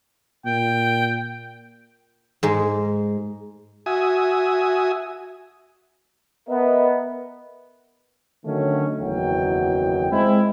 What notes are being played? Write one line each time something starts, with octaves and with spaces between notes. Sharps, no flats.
A#2 G5
G#2 G#3
F#4 E5 G#5 D#6
B3 A#4 D#5 E5
D3 D#3 F#3 A3 C#4
F#1 E2 D#3 F#3 G5
G#3 C4 E4